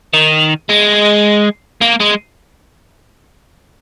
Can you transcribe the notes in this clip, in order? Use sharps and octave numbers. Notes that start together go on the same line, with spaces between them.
D#3
G#3
A#3
G#3